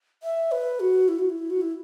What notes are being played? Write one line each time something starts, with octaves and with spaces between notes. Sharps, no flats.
E5
B4
F#4
E4
F#4
E4
F#4
E4